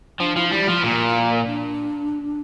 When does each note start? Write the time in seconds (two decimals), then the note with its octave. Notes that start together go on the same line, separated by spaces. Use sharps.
0.20 F3 D4
0.36 F3 E4
0.48 F4
0.51 G3 E4
0.68 F3
0.83 A#2 A#3
1.46 D4